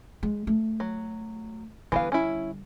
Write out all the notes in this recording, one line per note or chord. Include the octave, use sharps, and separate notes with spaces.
G#3
A3
F#3
D3 E3 G3 B3 F5
C#4 E4